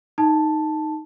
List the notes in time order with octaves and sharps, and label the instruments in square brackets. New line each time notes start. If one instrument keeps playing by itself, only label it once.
[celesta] D#4 A5